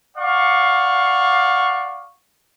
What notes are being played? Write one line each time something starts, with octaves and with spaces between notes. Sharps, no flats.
D5 F5 F#5 C#6